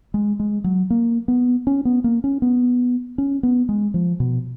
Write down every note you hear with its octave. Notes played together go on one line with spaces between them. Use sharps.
G#3
G#3
F#3
A#3
B3
C#4
B3
A#3
C#4
B3
C#4
B3
G#3
F3
B2